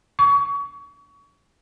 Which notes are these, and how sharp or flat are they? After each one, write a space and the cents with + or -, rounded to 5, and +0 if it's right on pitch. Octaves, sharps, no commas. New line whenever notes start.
C#6 +30